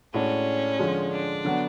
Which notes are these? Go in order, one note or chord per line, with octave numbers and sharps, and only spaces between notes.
A2 G#3 C#4 D4 F#4
D3 F3 G#3
D4
D3 F#3 B3